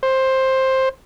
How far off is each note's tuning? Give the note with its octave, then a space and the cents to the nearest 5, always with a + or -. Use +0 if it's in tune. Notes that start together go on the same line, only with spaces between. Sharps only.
C5 +10